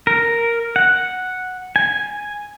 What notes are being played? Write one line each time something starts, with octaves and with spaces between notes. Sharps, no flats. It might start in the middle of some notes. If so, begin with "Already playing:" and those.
A#4
F#5
G#5